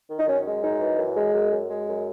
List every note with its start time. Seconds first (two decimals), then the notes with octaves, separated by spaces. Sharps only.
0.10 D#3
0.19 D#4
0.27 F#2 C#4
0.46 G#3
0.63 F#2 D#4
0.81 E3
0.99 F#2
1.17 G#3
1.34 F#2
1.52 F#2
1.70 G#3
1.88 F#2